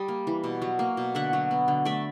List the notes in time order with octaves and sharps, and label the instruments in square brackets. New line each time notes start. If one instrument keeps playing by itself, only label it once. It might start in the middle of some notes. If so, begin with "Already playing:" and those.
Already playing: [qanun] G3 D#5
A#3
E3
B2
F#3
A#3
B2
D3 E5 F#5
F#3
B3
D3
A3 D5 E5